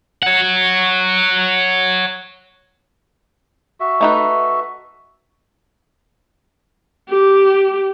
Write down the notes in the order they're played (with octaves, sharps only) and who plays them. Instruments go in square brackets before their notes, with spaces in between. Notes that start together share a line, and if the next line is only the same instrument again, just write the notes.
[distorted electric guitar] C#5 F#5
[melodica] F#4 E5
[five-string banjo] A3 D#4 B4
[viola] G4